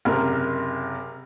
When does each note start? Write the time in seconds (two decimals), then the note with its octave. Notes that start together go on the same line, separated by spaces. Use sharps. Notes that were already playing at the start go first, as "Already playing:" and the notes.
0.05 F#1 C3 A#4